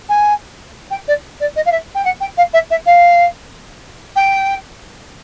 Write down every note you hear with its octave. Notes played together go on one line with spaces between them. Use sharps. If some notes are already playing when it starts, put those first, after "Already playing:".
G#5
G5
D5
D5
D#5
F5
E5
G5
F#5
G5
F5
E5
E5
F5
G5